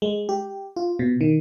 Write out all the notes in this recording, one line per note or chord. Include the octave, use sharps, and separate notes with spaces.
G#3
G4
F4
B2
D#3